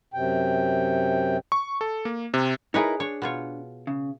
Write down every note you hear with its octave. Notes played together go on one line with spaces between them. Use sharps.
F#2 C3 G5
C#6
A4
A#3
C3
D#4 E4 G#4 A#4 B4 C#5
D4 C#5
B2 F4 C#5
C#3